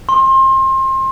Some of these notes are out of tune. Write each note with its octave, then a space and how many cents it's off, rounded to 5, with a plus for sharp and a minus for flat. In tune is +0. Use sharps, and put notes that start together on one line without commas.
C6 +30